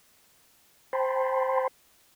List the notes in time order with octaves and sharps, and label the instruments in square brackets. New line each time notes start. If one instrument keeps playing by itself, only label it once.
[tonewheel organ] C5 G5 A5 B5 C6